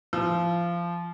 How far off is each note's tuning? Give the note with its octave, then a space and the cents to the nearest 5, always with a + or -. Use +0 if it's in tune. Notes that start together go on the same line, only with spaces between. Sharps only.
F3 -20